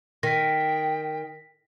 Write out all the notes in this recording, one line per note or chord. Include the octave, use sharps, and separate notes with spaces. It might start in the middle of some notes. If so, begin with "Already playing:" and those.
D#3 G5 A#6 B6